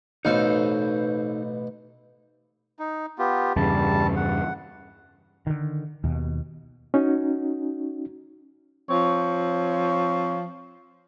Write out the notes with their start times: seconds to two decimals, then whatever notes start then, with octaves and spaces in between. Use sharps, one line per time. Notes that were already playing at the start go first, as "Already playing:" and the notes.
0.25 A1 B2 D#4 A4 C5 F5
2.79 D#4
3.18 B3 F4 G4
3.56 E2 G2 C#3 G3 A5
4.16 F#5
5.47 D3 D#3
6.04 D#2 B2
6.94 C#4 D#4 F#4
8.89 F3 C4 C#5